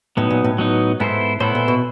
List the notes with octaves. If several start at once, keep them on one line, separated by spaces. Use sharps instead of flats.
A2 F#3 B3 D#4
A#2
A2
F#3 B3 D#4
G#2 B3 E4 A4 C5
A2 B3 E4 A4 C5
A#2
B2